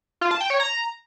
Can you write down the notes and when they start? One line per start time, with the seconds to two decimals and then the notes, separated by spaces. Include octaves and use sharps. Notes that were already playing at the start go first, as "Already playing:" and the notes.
0.21 F4
0.31 A5
0.41 G5
0.50 C#5
0.60 A#5